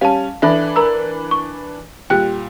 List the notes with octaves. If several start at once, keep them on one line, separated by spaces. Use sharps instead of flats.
G3 C#4 F5 A5
E3 D4 A4 E5 B5
A#4 A#5 E6
C#6
A#2 G3 G5 F#6